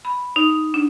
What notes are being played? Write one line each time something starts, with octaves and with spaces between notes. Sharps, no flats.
B5
D#4
D4